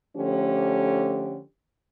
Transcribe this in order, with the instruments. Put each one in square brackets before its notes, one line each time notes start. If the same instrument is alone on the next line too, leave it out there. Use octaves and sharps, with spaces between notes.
[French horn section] D3 F3 A3 C#4 G4